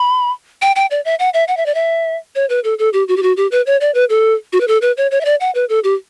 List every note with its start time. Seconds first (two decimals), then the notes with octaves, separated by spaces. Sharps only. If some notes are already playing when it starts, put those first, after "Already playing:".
Already playing: B5
0.62 G5
0.76 G5
0.91 D5
1.05 E5
1.19 F#5
1.34 E5
1.48 F#5
1.57 E5
1.66 D5
1.75 E5
2.35 C#5
2.49 B4
2.64 A4
2.79 A4
2.93 G4
3.08 F#4
3.17 G4
3.23 F#4
3.37 G4
3.51 B4
3.66 C#5
3.81 D5
3.94 B4
4.10 A4
4.53 F#4
4.61 B4
4.68 A4
4.82 B4
4.97 C#5
5.11 C#5
5.21 E5
5.25 D5
5.41 F#5
5.55 B4
5.69 A4
5.84 G4